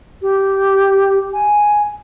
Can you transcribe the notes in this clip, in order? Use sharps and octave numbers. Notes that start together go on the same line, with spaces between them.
G4
G#5